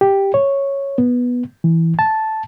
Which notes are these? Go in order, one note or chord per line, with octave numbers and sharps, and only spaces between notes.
G4
C#5
B3
E3
A5